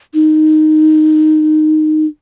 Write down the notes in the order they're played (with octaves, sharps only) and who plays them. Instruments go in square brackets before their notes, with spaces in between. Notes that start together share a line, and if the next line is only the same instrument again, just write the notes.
[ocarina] D#4